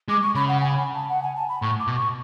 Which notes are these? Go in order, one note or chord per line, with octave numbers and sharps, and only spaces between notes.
G#3 D6
C#6
C#3 B5
F#5
G#5
B5
A5
F#5
G#5
A5
B5
A2 C#6
D6
B2
C#6